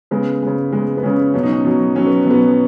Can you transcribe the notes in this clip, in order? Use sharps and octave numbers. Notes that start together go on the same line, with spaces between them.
C#3 G#3 B3
C#3 G#3
C#3 G#3 B3
B3
C#3 G#3 C#4
B2 F#3 C#4
D#4
C#4
B2 F#3
B2 F#3 C#4
B3
B2 F#3 B3